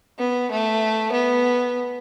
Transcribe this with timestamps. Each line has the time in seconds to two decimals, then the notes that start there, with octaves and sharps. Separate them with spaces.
0.19 B3
0.51 A3
1.12 B3